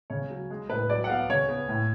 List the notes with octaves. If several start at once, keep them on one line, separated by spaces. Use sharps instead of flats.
C#3 C#5
F#3
G#3
A2 B4
F#3 D5
F#5
B3 F5
C#3 C#5
B3
A2